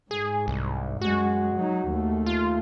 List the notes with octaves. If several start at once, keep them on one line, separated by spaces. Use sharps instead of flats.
G#2 G#4
C2
F#2 G#3 F#4
F#3 D#4
D#2 A3
F4